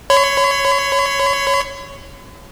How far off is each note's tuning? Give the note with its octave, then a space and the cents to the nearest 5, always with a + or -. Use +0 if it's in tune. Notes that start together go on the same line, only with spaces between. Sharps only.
C#5 +0 B5 +45